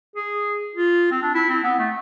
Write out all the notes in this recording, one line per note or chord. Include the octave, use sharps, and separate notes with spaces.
G#4
F4
C4
D4
E4
C4
B3
A3